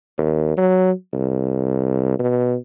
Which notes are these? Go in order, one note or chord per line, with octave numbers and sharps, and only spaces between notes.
D#2
F#3
C2
B2